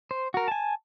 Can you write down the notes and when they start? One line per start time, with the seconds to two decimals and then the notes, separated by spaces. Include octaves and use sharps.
0.11 C5
0.34 F#4 A#4
0.48 G#5 A5